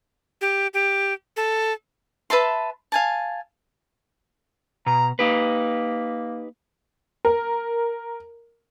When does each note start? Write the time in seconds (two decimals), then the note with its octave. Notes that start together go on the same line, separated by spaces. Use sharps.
0.41 G4
0.74 G4
1.37 A4
2.30 B4 E5 A5 C6
2.92 F5 G#5 A5
4.86 B2 A#5
5.19 A#3 D#4 G4 B4
7.25 A#4